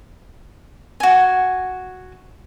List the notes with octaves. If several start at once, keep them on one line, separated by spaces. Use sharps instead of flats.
F#4 G#5